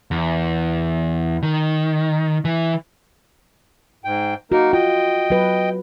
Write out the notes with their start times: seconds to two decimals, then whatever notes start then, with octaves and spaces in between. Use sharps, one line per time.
0.11 E2
1.43 D#3
2.45 E3
4.05 G#2 G5
4.52 A#3 D#4 F#4 A#4
4.73 F4 D#5 G5
5.30 F#3 B4